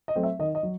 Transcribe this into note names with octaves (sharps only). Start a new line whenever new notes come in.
D#5
F#3 A3 C4
E5
D#3 D#5
D#5
F#3